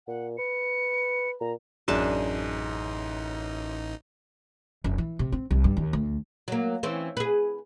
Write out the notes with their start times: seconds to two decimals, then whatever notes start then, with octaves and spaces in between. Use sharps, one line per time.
0.07 A#2 F#5
0.38 B4 C#7
1.40 A#2 A#5
1.88 A1 F#2 D4 D#4 G#4 A5
4.84 F#1
4.98 E3
5.19 C3
5.32 C4
5.51 C2
5.64 G2
5.77 D#2
5.93 D2
6.48 F#3 A#3
6.83 E3 C4 C#4
7.17 G#4 B4